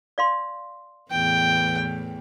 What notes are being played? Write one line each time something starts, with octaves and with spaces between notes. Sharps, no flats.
D5 F5 C6
E2 A2 E3 G5